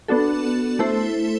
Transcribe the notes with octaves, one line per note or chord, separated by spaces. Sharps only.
B3 D4 F#4 A4
A3 E4 A4 C5